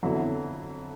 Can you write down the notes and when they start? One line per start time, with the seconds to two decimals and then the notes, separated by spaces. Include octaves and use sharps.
0.03 F2 D3 F#3 B3 E4